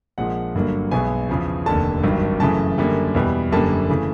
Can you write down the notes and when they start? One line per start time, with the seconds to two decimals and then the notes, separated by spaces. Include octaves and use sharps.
0.18 A#1 A#2 F3 G#3 F#5
0.55 G1 G2 D3 F#3 A#3
0.91 B1 B2 G#3 G#5
1.29 E2 C#3 F3
1.66 F1 D#2 D3 A5
2.03 G#1 G2 D#3 F#3
2.40 F#2 C#3 E3 A3 A5
2.78 F#2 D3 G3 A#3
3.14 E2 B2 G3
3.51 F#1 F#2 D3 G3 A#3 A5
3.89 C#3 E3 A3